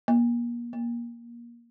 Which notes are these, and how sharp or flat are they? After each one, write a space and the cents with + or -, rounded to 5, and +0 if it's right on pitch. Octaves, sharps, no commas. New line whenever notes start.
A#3 +35
A#3 +20